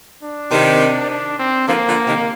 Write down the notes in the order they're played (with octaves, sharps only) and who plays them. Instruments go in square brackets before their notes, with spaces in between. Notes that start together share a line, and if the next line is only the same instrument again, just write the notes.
[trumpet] D4
[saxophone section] C3 D#3
[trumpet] D4
C4
[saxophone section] D3 F3 [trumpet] A#3
[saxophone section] D3 F3
C3 D#3